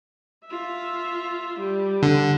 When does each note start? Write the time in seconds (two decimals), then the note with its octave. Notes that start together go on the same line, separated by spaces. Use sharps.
0.46 F4 E5
1.60 G3
2.03 D3